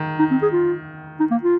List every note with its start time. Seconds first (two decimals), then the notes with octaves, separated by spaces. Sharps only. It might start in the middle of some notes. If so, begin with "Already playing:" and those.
Already playing: D#3
0.19 D#4
0.31 C4
0.42 G#4
0.53 F4
1.20 D#4
1.31 A#3
1.43 F4